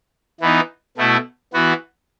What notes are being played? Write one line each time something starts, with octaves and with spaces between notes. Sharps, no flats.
E3 B3 D#4
B2 A3 E4
E3 B3 F#4